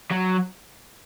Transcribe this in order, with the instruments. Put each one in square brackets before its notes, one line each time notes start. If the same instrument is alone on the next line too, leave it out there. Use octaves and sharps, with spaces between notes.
[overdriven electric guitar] F#3